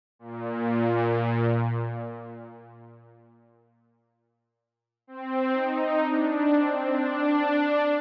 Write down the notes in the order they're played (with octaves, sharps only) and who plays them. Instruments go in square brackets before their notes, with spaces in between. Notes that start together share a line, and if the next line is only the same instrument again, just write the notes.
[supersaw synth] A#2
C4
D#4
D4
D4
C4
D4